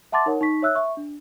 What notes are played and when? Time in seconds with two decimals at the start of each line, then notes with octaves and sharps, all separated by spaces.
0.12 E5 F#5 A5 C6 D6 A6
0.26 D#4 A#4 C#5 F#5
0.41 D#4 C#6 B6
0.62 C#5 E5 E6 F#6
0.75 E5 C#6
0.97 D4